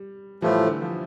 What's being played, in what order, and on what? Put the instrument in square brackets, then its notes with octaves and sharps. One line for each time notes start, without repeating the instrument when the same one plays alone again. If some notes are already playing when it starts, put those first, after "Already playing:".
Already playing: [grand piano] G3
[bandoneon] A2 F3 A3 [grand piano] E3 G3
[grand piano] D3
F3